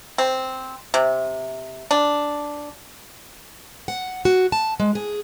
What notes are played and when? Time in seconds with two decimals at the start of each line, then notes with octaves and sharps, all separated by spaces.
0.18 C4
0.94 C3
1.91 D4
3.88 F#5
4.25 F#4
4.52 A5
4.80 G#3
4.95 G#4